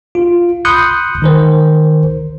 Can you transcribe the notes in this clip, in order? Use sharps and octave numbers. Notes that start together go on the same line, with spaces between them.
F4
B5 C6 D#6 F#6 G6 C#7
D#3 A#4 C5